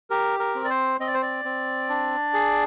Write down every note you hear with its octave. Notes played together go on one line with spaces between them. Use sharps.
G4 A#4
A#4
C4
D5
C5
C4 D#5
D5
C5
D5
C4
D4
G#4